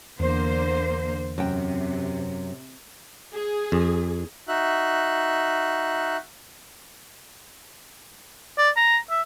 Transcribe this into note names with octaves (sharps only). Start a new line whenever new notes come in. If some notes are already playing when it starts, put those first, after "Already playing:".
E2 D3 A#3 C5
F#2 C3 G5
G#4
F2
D#4 F#4 E5 F#6
D5
A#5
E5